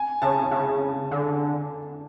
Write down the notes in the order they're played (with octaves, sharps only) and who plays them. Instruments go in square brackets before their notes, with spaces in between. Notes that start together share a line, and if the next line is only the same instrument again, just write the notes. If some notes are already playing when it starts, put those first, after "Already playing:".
Already playing: [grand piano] G#5
[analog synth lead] C#3 [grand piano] A5
[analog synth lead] C#3
D3